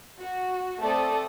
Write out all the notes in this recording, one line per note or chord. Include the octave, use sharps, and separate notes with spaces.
F#4
A3 C4 A4 D5 A5 D#6